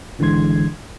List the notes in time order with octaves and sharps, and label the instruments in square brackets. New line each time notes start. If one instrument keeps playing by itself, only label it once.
[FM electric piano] G#1 D3 E3 G#3 C6 G#6